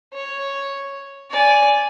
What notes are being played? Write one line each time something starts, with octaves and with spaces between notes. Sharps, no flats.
C#5
D5 G#5